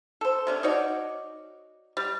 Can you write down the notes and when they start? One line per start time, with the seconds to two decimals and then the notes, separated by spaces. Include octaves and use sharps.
0.21 A4 C5
0.47 C3 C#4 D4
0.63 D#4 F#4 C#5 D5
1.97 G3